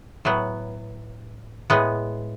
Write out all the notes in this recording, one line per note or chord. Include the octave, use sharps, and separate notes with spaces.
A2 F#3 B3
A2 G#3 B3